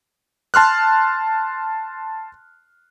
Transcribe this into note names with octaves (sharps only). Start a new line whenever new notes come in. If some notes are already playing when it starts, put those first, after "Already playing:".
A5 C6 F6 F#6